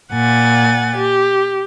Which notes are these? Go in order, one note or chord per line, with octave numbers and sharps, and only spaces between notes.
A#2 F#5 G#5 A6
G4